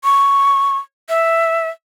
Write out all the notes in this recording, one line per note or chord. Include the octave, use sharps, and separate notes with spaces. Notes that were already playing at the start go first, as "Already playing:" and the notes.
C#6
E5